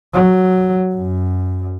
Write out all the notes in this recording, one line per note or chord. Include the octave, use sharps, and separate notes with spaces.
F#3
F#2